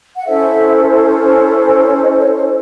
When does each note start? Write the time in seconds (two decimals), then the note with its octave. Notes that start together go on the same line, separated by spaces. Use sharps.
0.15 F#5
0.26 C#4 E4 A4 C5 E5
1.67 G#5
1.84 C#5
2.02 D#5
2.19 C#5
2.37 C#5